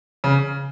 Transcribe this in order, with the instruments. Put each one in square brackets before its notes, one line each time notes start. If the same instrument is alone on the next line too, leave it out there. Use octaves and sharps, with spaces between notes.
[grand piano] C#3